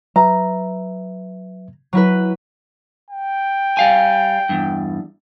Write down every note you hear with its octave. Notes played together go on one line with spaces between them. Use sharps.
F#3 B4 E5 A#5
F#3 E4 B4
G5
G3 F5 G#5
E2 G2